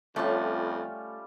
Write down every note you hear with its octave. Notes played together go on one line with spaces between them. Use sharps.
F2 G3 A3 C#4 F4